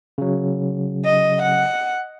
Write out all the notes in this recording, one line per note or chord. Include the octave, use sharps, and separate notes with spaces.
C#3 F#3
D#5
F#5